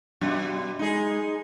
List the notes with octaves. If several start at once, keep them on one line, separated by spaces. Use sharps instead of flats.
F#2 B2 G3
G#3 D#4 G#4